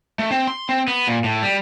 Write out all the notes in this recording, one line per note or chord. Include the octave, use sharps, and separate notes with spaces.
A3
C4
C6
C4
B3
A#2
A2
G3